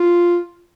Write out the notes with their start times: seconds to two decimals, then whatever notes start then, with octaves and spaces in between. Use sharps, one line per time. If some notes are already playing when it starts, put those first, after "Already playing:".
Already playing: F4